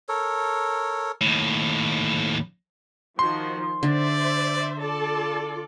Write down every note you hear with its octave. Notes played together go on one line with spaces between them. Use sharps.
A4 A#4 C#5
D#2 A2
D#3 F3 F#4 C6
D3 C5 D5 E5
F4 A4 D5 A5